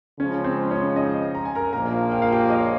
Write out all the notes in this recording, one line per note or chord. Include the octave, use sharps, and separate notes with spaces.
C#3 F3 G#3 C#4 C#5
C4 C5
C#4 C#5
D#4 D#5
A#5
G#5
A#4 A#5
A#1 A#2 F3 A#3 A#4 A#5
G5
F5
G4 G5
D#5
C#5